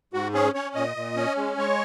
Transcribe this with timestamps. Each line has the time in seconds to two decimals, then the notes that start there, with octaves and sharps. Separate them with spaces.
0.13 G#2 F#4
0.34 C#4 G#4
0.54 C#4 C#5
0.75 A#2 D#5
0.96 A#2
1.16 C#4
1.37 G#3
1.58 G#3 C#5